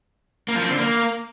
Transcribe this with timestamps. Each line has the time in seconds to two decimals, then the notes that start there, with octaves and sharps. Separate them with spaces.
0.48 A#3
0.56 F3
0.63 C4
0.71 D3
0.78 A#3